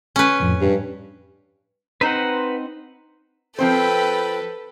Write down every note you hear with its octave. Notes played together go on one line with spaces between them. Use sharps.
C#4 B4
F2 A2
G2
C4 D#4 B4 C5 F#5
F3 C4 A4 B4 C5 G5 B5